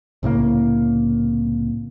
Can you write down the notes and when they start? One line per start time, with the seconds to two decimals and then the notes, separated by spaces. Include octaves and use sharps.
0.23 C2 A2 C#3 A#3